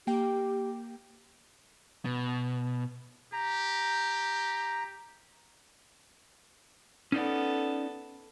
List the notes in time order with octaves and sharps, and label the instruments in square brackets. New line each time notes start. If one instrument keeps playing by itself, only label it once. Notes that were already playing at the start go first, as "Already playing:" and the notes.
[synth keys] A#3 G5 [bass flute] G4
[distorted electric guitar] B2
[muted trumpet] G4 [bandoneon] A#5
[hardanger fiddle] B3 A4 [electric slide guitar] C#4 D#4 D5